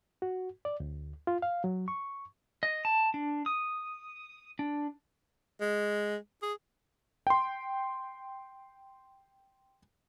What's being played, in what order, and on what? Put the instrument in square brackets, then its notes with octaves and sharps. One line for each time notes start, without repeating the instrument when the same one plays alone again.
[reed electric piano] F#4
D5
D2
F4
F5
F#3
C#6
[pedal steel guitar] D#5
A5
D4
D#6
D4
[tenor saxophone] G#3
G#4
[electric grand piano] G5 C6